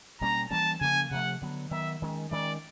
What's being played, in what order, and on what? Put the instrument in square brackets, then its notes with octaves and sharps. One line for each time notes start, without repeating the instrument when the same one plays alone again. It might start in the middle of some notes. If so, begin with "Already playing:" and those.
[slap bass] B2 G3 A#3 C#4 [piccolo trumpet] A#5
[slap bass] E3 G3 A#3 C#4 [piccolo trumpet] A5
[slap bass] C#3 F3 A#3 C#4 [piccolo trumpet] G#5
[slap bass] C3 F3 A3 [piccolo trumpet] F#5
[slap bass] D3 F#3 B3
[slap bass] D#3 F#3 B3 [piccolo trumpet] E5
[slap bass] D#3 G#3 C#4
[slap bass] D#3 G#3 C#4 [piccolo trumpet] D5